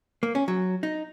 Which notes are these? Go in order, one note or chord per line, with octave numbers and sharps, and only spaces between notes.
A#3
C#4
F#3
D#4